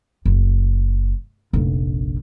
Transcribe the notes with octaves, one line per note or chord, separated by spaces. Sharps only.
F#1
F1 A#1